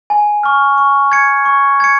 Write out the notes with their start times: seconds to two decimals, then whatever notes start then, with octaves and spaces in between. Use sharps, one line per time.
0.10 G#5
0.43 C#6 F6
0.78 C#6
1.12 G#6 C#7
1.45 C#6
1.80 G#6 C#7